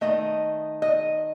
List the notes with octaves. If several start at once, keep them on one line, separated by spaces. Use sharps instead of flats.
D#3 A3 D#5
D#5